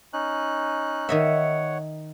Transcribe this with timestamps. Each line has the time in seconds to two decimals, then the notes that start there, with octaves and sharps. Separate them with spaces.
0.13 C#4 D#4 F#6
1.09 D#3 C#5 D#5 E5 F#5